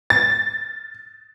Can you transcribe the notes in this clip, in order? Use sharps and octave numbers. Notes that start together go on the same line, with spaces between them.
A6